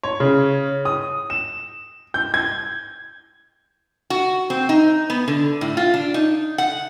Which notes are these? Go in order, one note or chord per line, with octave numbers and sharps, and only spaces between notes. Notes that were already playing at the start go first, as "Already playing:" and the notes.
C#5
C#3
D#6
E7
G6
G#6
F#4
C4
D#4
B3
D3
A2
F4
D4
D#4
F#5